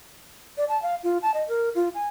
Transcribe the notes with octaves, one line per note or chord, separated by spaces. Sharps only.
D5
A5
F5
F4
A5
D#5
A#4
F4
G#5